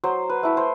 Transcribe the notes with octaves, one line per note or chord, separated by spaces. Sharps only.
F#3 C5
B4
A3 E4
C5